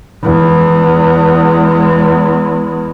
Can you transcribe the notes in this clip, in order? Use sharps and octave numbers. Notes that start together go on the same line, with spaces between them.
E2 G#3